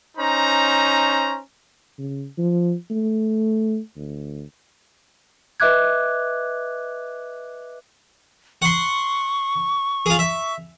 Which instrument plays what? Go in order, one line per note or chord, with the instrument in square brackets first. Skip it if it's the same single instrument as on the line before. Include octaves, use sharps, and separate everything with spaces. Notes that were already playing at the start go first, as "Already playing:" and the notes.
[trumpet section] C#4 D#4 C5 A#5
[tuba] C#3
F3
A3
D2
[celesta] B4 D#5 E5 D6 F#6 G#6
[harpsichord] F#5 C6 [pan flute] C#6
[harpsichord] F4 G#4
E5